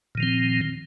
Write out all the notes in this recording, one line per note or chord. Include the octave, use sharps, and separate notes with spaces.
A#2 D#3 F3 C4